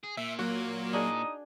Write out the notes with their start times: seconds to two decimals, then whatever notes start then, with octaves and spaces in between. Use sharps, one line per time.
0.03 G#4
0.17 A#2 E5
0.39 F#3 A#3 F#4
0.93 D4 D#4 G#4